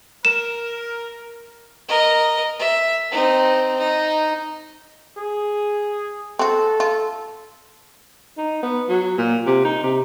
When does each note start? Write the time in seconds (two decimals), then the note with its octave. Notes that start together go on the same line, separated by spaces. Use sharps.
0.25 A#4 E7
1.88 A#4 D#5
2.59 E5
3.11 C4 D#4
3.78 D#4
5.17 G#4
6.39 C4 F#4 A4
6.80 F4
8.38 D#4
8.63 B3
8.89 F#3
9.18 A#2
9.46 C3
9.65 D#4
9.83 C3